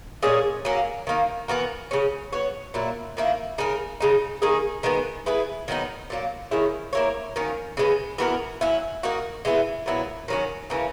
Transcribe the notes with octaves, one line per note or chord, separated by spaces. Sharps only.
A#2 G#3 C#4 G#4
F#3 A#3 C#4
D#3 A#3 D#4
E3 B3 F#4 A#4
C#3 G#3 C#4
B3 F#4 C#5
A#2 F#3 A#3 E4
D#3 A#3 E4
C#3 G#3 D#4 A#4
C#3 G#3 D#4
D#3 A#3 D#4 G#4
D#3 G#3 B3
B3 E4 G#4 B4
D#3 F#3 B3 D#4
A#2 F#3 A#3
D#3 G#3 C#4 E4
A#3 E4 A#4 C#5
D#3 A#3 C#4 F#4
C#3 G#3 B3
E3 B3 F#4 A#4
F#3 C#4 E4
A#3 D#4 F#4
E3 G#3 B3 E4
A#2 F#3 B3 E4
D#3 F#3 C#4
C#3 E3 A#3 C#4